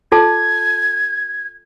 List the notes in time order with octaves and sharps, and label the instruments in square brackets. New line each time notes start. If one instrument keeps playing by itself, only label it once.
[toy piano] F4 A4 A5 [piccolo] G#6